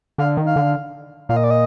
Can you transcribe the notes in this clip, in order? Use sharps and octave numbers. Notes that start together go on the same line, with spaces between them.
D3 F5
D#3
F5
D3
A#2 F5
D#5
D5
D#5